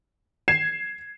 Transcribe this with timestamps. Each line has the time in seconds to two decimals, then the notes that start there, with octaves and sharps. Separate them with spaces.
0.48 G#6 C7 E7